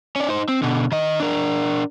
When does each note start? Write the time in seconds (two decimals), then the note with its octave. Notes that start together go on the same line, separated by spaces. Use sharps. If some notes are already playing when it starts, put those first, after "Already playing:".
0.16 C#4 D5
0.29 D#4 C5
0.48 C4
0.62 B2 D3
0.92 D#3 D#5
1.20 D4 A#4